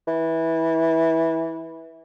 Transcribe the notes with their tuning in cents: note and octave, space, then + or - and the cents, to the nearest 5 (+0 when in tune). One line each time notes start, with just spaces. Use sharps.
E3 -15